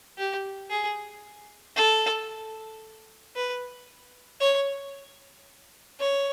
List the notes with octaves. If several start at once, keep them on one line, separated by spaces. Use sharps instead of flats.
G4
G#4
A4
B4
C#5
C#5